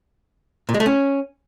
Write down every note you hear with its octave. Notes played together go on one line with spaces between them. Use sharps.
A#2
G#3
A3
C#4